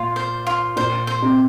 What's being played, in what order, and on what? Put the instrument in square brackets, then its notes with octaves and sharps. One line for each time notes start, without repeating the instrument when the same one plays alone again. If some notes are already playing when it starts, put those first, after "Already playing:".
Already playing: [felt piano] A#2 [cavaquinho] F4
[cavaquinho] C5
F4
[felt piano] A#2 [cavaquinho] C5
[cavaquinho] C5
[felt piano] C3